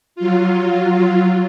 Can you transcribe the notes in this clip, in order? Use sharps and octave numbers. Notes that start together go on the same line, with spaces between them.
F#3 F4